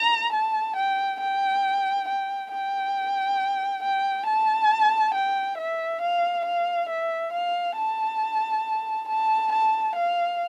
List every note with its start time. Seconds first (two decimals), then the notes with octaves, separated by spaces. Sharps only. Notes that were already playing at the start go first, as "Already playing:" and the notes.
Already playing: A#5
0.33 A5
0.77 G5
1.20 G5
2.08 G5
2.52 G5
3.83 G5
4.26 A5
5.14 G5
5.58 E5
6.01 F5
6.45 F5
6.89 E5
7.33 F5
7.77 A5
9.08 A5
9.52 A5
9.96 F5